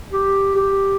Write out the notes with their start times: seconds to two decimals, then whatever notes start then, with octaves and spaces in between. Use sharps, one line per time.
0.13 G4
0.56 G4